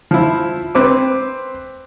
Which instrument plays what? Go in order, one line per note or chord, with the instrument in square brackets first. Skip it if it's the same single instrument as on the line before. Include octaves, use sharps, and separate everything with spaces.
[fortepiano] F3 E4
C4 B4 D6